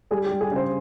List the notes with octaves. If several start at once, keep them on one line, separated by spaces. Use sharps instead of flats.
G3 G#4
G4
G3
G#4
C#3 C5